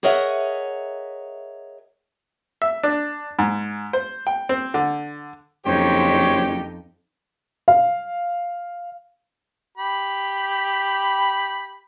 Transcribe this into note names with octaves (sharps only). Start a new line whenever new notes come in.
G#4 A#4 C#5 D#5 E5 F#5
E5
D4
G#2
C5
G5
C4
D3
F#1 F2 D#4 G4 C5 C#5
F5
G4 B5